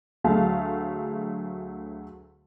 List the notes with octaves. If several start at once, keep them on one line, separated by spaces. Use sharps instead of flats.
D2 F#3 A3 G#4 F5 A5